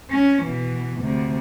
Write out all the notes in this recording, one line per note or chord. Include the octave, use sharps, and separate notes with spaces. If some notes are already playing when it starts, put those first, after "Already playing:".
C#4
B2 E3
D2 C3